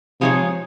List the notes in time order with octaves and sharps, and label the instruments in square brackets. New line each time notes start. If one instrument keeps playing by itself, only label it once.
[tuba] C3 [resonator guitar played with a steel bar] F3 G#3 D#4 G#4 C#5